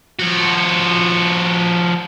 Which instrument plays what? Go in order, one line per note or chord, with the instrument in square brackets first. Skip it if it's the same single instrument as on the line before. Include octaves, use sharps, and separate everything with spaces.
[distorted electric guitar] F3 F#4